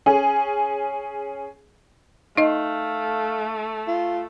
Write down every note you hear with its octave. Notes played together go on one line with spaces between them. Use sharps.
C#4 G#4
A3 D#4 D#5 F5
F4